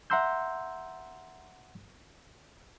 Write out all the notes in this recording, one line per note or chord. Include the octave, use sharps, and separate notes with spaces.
E5 F#5 A#5 C6 E6 G6